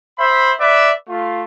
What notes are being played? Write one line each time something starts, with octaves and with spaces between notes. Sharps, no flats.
C5 E5 B5
B4 D5 E5
A3 F4